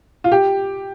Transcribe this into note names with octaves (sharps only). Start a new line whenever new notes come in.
F4
G4